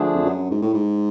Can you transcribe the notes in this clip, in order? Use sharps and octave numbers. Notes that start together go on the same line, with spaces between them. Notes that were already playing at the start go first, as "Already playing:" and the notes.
Already playing: D3 F3 A3 D4 G#4
F2
F#2
G#2
A2
G#2